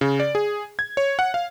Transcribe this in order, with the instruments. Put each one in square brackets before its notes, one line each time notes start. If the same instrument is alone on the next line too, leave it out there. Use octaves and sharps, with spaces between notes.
[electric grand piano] C#3
D5
G#4
G#6
C#5
F#5
F5